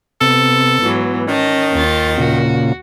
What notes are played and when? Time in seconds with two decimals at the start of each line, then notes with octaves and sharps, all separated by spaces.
0.21 C3 B3 A4
0.80 G#2 E3 F#3 B3
1.29 D#3 C#4 D#5 A5
1.73 D#2 F4 A6
2.18 A#2 C#3 F4 F#4